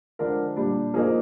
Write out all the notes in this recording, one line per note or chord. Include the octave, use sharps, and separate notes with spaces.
D3 F3 G#3 D4 A#4
A#2 G3 D4
F3 A#3 D#4 G#4